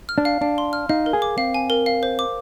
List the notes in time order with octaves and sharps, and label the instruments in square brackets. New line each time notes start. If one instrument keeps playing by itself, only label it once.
[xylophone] F6
[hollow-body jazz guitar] D4
[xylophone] F5
[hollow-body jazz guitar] D4 [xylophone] F5
[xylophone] C6
F6
[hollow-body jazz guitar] D#4 [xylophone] F5
[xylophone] A#4
[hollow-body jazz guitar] G#4
[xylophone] D6
[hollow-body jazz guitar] C4 [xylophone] F5
[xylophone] G#5
A#4
F5
C5
D6